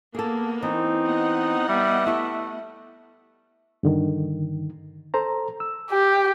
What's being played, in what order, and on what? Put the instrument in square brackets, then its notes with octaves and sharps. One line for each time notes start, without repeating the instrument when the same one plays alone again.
[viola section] A#3 B3 [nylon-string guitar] G#4 A4
[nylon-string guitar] E3 [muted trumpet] C4 [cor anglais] D#4
[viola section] B3 D#5 F#5
[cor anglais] G3 [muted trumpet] E5
[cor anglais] A3 [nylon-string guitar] E4 G4
[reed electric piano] G2 D3 D#3
A4 C5 A#5
E6
[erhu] G4